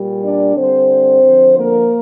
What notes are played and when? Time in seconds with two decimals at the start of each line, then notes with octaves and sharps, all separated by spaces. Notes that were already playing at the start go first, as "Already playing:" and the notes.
Already playing: A#2 G3
0.23 D4 D5
0.56 D3 G3 C4 C5
1.23 D3 F3
1.57 A#3 A#4